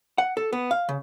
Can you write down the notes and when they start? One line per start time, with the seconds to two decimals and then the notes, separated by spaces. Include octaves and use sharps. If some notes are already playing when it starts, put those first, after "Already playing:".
0.18 F#5
0.37 A4
0.53 B3
0.71 F5
0.89 C#3